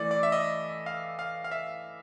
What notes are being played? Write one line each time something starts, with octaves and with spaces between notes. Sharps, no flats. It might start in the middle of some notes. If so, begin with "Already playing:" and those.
Already playing: E3 A3 D5
D5
E5
D#5
F5
F5
F5
E5